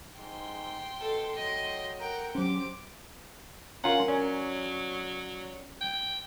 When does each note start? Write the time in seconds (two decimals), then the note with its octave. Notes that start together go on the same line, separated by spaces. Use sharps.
0.19 G#2 G5 C6
0.99 B2 A4
1.35 F#3 D#5
1.99 A#4 F#5 G5 A#5
2.35 F#3 C#4 G4 C5 D6
3.84 C#4 F4 A#4 F#5 G#5 A#5
4.08 F#3 C#4 D5
5.81 G5